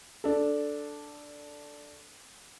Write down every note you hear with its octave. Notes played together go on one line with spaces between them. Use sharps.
D4 A4